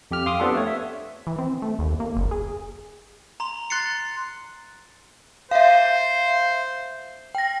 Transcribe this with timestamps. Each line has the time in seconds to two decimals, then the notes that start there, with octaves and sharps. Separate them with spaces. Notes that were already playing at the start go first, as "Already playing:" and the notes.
0.11 F2 G4 F6
0.26 F5 C6 D6 D#6
0.40 B3 C4 D4 F4 G4 A4
0.54 A3 C#5
0.67 E5
1.27 E3
1.38 C4
1.62 A3
1.79 D#2
2.00 A#3
2.16 F#1
2.31 G#4
3.40 A#5 C6 F7
3.70 C6 F#6 A6 C7 C#7
5.51 C5 E5 F5
7.35 G5 A#6